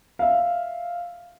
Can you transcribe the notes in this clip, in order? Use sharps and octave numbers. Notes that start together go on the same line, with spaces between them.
E5 F5